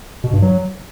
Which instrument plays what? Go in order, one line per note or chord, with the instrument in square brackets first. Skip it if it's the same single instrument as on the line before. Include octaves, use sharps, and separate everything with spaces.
[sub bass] B2
G2
F#3